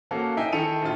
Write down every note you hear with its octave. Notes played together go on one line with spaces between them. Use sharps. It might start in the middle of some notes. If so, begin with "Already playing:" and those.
A#3 C#4 F#4 A4 F5
D#4 E5 G5 G#5
D#3 E4 A4 C#7 D#7 F7
A#1 F4